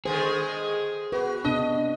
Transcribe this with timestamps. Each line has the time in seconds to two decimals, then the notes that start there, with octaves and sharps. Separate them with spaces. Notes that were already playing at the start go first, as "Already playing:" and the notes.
0.06 D3 D#3 G#3 G#4 C5
1.12 F#4 B4
1.44 C3 B3 D4 D#5